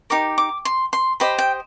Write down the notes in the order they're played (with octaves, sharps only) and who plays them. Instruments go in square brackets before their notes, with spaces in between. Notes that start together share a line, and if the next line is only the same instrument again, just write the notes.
[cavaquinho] D#4 G4 A#4 D6
D6
C6
C6
G4 C5 D#5 B5
G5